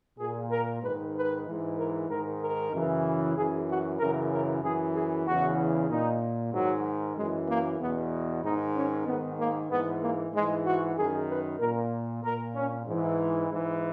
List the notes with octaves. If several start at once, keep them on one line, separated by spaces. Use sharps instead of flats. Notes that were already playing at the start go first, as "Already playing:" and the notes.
A#2 G#4
A#4
G#2 D#3 B4
B4
G#2 E3
A#4
G#2 D#3 A#4
A#4
F#2 C#3 E3
F#2 E3 G#4
F#4
F#2 C#3 E3 A#4
A#4
F#2 E3 G#4
G#4
E2 C#3 E3 F#4
A#2 D#4
G#2 D#3 F#3
F#2 E3 G#3
A#3
E2 B2 B3
G#2 D#3 D#4
C#4
G#2 D#3 B3
A#3
G#2 E3 B3
A#3
G#2 E3 G#3
F#4
F#2 D#3 G#4
B4
A#2 A#4
A#2 A#4
C#4
G#2 E3
G#2 E3